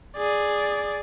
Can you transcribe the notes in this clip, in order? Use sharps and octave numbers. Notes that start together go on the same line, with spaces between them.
G#4 D5